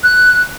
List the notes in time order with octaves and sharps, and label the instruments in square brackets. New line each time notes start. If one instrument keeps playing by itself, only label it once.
[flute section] F#6